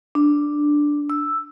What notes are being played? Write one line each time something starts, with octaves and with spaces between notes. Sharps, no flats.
D4
E6